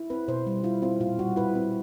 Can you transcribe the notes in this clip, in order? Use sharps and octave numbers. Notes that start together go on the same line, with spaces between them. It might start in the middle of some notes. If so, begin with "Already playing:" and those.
Already playing: E4
C4 B4
B2 C5
G3
E4 F4
C4 F4
A#2 F4
G3 F#4
E4 B4
C4